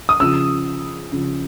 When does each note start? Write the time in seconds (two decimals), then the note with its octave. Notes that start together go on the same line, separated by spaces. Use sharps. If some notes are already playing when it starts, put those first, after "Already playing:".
0.09 D#6
0.20 C#3 F3 E6
1.12 C#3 F3